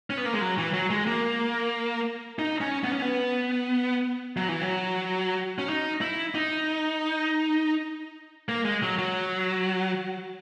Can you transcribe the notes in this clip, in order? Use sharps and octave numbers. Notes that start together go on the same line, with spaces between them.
C#4
B3
A#3
G#3
F#3
E3
F#3
G#3
A#3
D#4
C#4
B3
C#4
B3
F#3
E3
F#3
C#4
D#4
E4
D#4
A#3
G#3
F#3
F#3